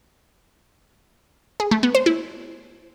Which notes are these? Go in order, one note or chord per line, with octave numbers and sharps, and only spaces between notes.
G#4
A3
B3
C5
E4